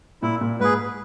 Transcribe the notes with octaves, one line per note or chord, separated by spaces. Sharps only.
A#2 E4
A#2
G#2 G#4 B4